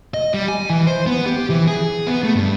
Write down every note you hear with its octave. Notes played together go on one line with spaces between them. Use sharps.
D#5
G3
G#5
E3
C5
B3
G4
E3
G#4
B3
A3
G2